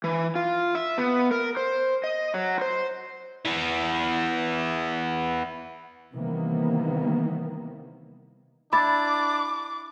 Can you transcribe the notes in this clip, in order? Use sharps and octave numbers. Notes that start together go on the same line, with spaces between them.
E3
F4
E5
B3
A#4
C5
D#5
F#3
C5
E3 B3
C3 D#3 E3 G3 A#3 B3
D4 E4 B5 D6 A6